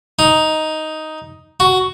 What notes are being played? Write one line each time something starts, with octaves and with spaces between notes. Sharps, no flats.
D#4
F#4